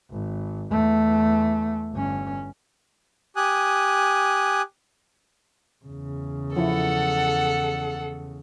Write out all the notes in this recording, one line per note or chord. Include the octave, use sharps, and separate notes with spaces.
G#1
E2 A3
G1 C#4
G4 G#5 D#6 F#6
E2 C#3
F3 E4 A4 F#5